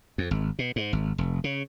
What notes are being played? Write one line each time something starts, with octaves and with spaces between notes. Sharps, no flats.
F2
G#1
B2
G#2
G#1
F1
C#3